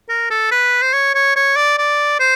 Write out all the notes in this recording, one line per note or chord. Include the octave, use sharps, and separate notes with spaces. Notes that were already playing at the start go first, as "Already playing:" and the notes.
A#4
A4
B4
C5
C#5
C#5
C#5
D5
D5
C5